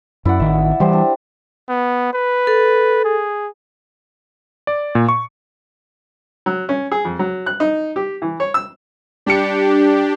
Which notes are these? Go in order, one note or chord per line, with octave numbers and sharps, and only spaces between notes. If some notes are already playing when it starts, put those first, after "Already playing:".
F#2 E4 D5 F#5
A1 D#3 E5
E3 G3 G4 C5
D4
B3
B4
A4
G#4
D5
A#2
C#6
F#3
C#4
G#4
F2
F#3
F#6
D#4
G4
E3
C#5
E6
G3 D4 G4 C#7